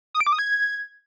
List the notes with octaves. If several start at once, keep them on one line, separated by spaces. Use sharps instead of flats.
D#6
D7
D6
D#6
G#6